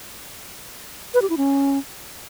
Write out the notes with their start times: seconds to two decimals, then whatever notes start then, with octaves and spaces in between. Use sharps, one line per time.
1.14 B4
1.22 G4
1.30 E4
1.37 C#4